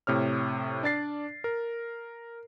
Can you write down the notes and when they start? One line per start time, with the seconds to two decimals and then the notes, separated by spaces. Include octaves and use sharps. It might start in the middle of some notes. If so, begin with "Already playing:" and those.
0.07 A2 C3 C#5 F6
0.83 D4 D5 A6 C7
1.44 A#4